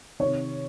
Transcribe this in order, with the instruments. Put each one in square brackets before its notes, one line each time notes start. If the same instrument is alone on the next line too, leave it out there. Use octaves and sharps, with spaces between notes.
[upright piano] C3 D#3 C#5